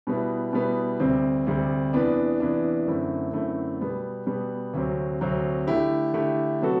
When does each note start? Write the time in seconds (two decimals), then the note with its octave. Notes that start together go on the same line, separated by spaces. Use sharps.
0.07 B2 G3 B3 E4
0.53 B2 G3 B3 E4
1.00 D2 C3 G3 C4
1.47 D2 C3 G3 C4
1.93 E2 C3 E3 B3 D4
2.40 E2 C3 E3 B3 D4
2.87 F#2 D3 A3 C4 E4
3.33 F#2 D3 A3 C4 E4
3.81 B2 G3 B3
4.27 B2 G3 B3
4.74 D2 C3 F#3 C4
5.21 D2 C3 F#3 C4
5.67 D3 A3 E4 G4
6.14 D3 A3 E4 G4
6.61 C3 F#3 B3 F#4 A4